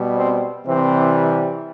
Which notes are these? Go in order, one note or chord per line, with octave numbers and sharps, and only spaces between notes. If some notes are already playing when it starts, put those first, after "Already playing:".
Already playing: B2 G3
C4
C3 E3 G3 C4